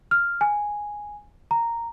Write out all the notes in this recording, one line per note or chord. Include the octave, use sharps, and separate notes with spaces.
F6
G#5
A#5